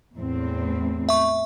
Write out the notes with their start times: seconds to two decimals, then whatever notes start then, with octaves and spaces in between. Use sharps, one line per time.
0.17 E2 A2 C4
1.09 E5 C#6